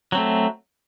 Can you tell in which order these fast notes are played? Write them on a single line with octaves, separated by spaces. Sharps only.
F#3 C4 A3